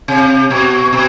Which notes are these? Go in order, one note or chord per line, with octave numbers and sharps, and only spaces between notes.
C3
B2
B2